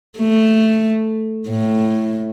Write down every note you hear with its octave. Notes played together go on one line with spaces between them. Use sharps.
A3
A2